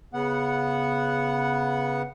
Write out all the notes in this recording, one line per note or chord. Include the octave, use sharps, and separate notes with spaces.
C#3 B3 F#5